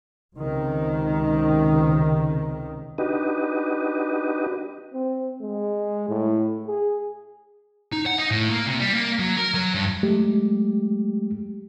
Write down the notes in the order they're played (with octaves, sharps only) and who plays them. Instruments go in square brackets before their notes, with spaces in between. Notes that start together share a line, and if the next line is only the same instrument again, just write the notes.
[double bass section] C#2 C3 D#3
[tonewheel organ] D4 D#4 F#4 G4 B4 D#5
[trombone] C4
G#3
A2
G#4
[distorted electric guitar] D#4
F#5
D#4
A2
A#3
C3
G3
A#3
F#3
A#4
F#3
G2
[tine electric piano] F#3 G#3 A3 G4